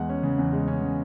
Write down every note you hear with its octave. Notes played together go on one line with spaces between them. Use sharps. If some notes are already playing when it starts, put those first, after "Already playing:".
Already playing: E2 G#3 F#5
C#4
C#3
E2
G#3
C#4
C#3